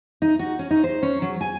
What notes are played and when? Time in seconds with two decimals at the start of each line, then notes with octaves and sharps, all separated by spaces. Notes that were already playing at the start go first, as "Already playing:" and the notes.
0.22 D#4
0.39 F#4
0.59 C#4
0.71 D#4
0.84 C5
1.02 C#4
1.22 F#3
1.41 G#5